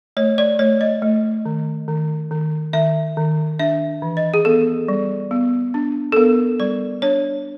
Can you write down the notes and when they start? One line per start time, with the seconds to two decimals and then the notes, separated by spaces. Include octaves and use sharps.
0.17 A3 C#5
0.38 D5
0.59 A3 C#5
0.81 D#5
1.02 A3
1.46 D#3
1.88 D#3
2.31 D#3
2.73 D#3 E5
3.17 D#3
3.59 D4 E5
4.02 E3
4.17 D#5
4.34 G#4
4.45 B3 A4
4.88 G3
5.31 B3
5.74 D4
6.12 A4
6.16 B3 A#4
6.60 G3 D5
7.02 D4 C#5